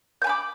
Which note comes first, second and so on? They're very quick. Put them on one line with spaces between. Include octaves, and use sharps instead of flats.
G6 G#5 B5 D6